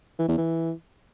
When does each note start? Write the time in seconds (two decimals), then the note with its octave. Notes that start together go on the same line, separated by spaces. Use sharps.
0.19 E3
0.28 E2
0.38 E3